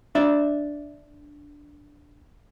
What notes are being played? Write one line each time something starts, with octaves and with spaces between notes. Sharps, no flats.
D4 D5 E5